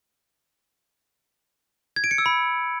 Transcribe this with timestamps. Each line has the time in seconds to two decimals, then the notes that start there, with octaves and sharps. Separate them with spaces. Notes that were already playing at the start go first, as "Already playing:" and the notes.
1.96 G#6
2.04 D7
2.11 C#7
2.18 E6
2.26 B5